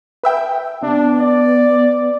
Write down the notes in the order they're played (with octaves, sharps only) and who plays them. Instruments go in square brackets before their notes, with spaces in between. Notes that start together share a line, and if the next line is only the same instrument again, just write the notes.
[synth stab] B4 E5 G5
[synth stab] C3 [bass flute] B3 [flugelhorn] D4
[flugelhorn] D5